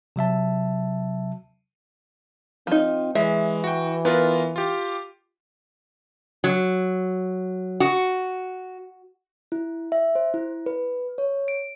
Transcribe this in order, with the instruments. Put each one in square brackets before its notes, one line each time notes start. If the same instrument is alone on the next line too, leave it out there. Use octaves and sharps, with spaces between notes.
[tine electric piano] C3 F#3 E5 A5
[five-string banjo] F3 D#4 [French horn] C4
[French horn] E3 [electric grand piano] G#3 [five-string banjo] E5
[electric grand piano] F#4 G5
[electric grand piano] B3 F4 A#4 [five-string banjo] B4
[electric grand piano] F4 G4
[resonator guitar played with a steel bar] F#3
F#4
[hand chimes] E4
E5
C5
E4
B4
C#5
D7